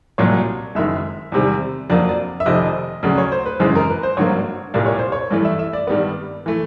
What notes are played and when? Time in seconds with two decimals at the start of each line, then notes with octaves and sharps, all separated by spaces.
0.18 C2 A#2 F#3 C#5
0.75 F#1 F#2 D#3 G#3 E5
1.32 E2 C3 D#3 G3
1.90 F2 D3 F#3 A#3 D5
2.09 D5
2.40 E5
2.46 F1 F2 C3 D#3 D#5
3.03 D2 C#3 F#3 D5
3.18 C#5
3.32 C5
3.46 B4
3.60 G#1 F#2 C#3 E3 G#3 C5
3.75 A#4
3.90 B4
4.03 C5
4.17 G#1 G2 D3 F#3 A#3 C#5
4.74 C2 A#2 G3 A#3 D5
4.86 C#5
4.99 C5
5.12 C#5
5.31 G2 E3 A3 D5
5.45 E5
5.59 E5
5.73 D5
5.87 G2 D#3 G3 B3 D5
6.46 E3 A3